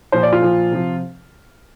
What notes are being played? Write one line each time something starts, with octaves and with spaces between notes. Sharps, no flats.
A#2 F3 C5
D5
F4
A#2 F3
C3 F3